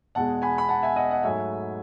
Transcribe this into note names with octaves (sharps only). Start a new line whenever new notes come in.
E2 B2 G#3 F#5 A5
G#5 B5
B5
F#5 A5
E5 G#5
D#5 F#5
D#5 F#5
G#2 F#3 A3 E5 G#5